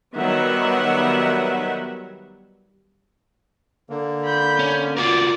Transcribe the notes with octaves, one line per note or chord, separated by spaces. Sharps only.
D#3 F#3 G3 B3 E5 F#5
D3 A#3
B5 G6
C#4
F4 F#4 A#4 D5